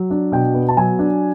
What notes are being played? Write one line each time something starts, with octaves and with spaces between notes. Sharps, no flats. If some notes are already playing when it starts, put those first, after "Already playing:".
Already playing: F#3
D4
B2 G5
B3
A5
F#3 G#5
D4